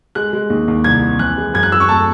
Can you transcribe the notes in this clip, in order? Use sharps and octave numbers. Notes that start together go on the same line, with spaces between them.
G#3 F#6
G#3
D#2
D#2
C2 G#6
C4
E3 F#6
G#3
F#2 G#6
F#6
F#2 E6
C#6
A3 A5